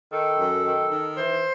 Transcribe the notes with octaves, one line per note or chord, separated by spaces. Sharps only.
D#3 A4
F#2
D#3
D#3
E3 C5